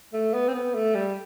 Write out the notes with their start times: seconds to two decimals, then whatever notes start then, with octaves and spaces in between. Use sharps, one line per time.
0.13 A3
0.34 B3
0.48 C4
0.54 B3
0.75 A3
0.95 G3